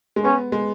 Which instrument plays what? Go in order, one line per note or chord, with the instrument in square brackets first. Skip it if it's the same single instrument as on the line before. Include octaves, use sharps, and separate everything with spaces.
[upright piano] G#3
[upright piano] B3 [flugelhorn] C#4
[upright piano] G#3